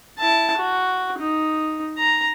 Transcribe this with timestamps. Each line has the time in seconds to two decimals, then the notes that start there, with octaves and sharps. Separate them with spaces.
0.19 E4 A5
0.58 F#4
1.19 D#4
1.98 A#5